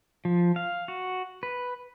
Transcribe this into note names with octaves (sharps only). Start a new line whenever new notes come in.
F3
F5
F#4
B4